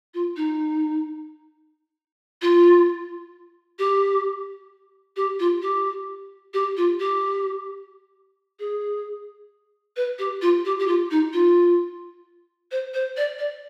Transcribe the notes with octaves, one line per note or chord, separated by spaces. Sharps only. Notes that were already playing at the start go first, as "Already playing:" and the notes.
F4
D#4
F4
G4
G4
F4
G4
G4
F4
G4
G#4
B4
G4
F4
G4
G4
F4
D#4
F4
C5
C5
D5
D5